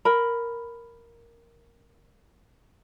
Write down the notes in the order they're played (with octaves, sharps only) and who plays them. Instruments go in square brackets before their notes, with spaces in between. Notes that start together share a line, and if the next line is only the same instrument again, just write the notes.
[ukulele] A#4 B5